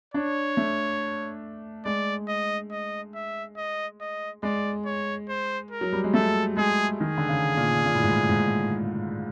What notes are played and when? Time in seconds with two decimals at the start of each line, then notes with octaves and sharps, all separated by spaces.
0.14 D4 C#5
0.57 A3
1.85 G#3 D5
2.28 D#5
2.71 D#5
3.15 E5
3.57 D#5
4.01 D#5
4.43 G#3 D5
4.85 C#5
5.29 C5
5.71 A#4
5.81 F#3
5.93 G3
6.04 G#3
6.14 A3 A4
6.57 G#3 G#4
6.99 D#3 G#4
7.18 D3
7.29 C#3
7.57 A#2
7.86 A#2
7.95 A2
8.03 G#2
8.12 A2
8.29 G#2